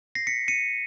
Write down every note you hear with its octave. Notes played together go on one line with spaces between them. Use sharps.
A#6 C7
B6 C#7
C#7 D#7